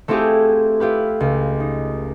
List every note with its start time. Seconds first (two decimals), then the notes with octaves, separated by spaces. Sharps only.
0.08 A3 C4 E4 F4 G4 G#4
0.80 E4 F4 G4 B4
1.20 C#2
1.60 D#4